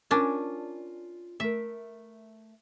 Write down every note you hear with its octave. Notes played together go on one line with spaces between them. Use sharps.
C#4 D4 F4 A#4 G#5
A3 A#4 E5